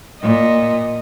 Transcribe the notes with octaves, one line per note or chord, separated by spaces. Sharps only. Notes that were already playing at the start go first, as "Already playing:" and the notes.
A#2 D#5